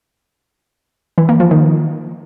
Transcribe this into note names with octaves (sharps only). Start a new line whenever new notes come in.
E3
A#3
F3
D#3